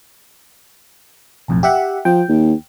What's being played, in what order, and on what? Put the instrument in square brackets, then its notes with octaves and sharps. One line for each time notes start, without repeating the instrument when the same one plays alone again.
[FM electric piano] B1 F2 A2
G4 E5 F#5
[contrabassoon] F3 [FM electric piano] G5
[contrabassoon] D#2